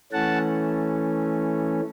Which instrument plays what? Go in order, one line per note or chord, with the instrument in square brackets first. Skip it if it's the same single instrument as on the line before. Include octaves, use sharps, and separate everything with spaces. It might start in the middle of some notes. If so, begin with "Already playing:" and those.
[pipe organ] E3 A3 C#4 F#5 A5